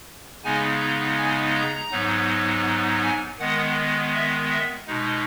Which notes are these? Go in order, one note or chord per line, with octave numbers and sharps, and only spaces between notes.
C#3 G#3 B3 D#4 G#5
A#5
G#5
A#5
G#2 F#3 B3 D#4
G#5
D#3 G#3 B3 F#5
E5
E5
B2 G#3 D#4